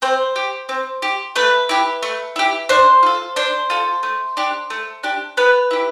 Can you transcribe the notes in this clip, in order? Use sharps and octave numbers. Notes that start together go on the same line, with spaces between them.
C4 C5
G4
C4
G4
A3 B4
E4 G4
A3
E4 G4
D4 C5
F4 A4
D4 C5
F4 A4
A3
D4 G4
A3
D4 G4
B3 B4
E4 G4